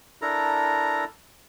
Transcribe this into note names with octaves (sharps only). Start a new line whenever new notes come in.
D4 E4 A4 A#4 A#5